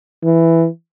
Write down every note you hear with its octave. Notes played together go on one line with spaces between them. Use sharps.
E3